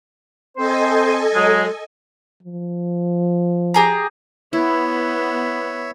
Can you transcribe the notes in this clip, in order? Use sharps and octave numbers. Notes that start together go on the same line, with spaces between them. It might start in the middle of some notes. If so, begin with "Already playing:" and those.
C4 A4 C5 D#5 G#5
F#3 G#3
F3
G4 G#4 A#5
B3 E4 C#5 E5